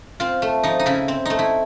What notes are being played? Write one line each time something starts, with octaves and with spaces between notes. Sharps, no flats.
C4 F4
A3
F3 D#4
D#4
C#3 E4
C4
A3 D#4
E4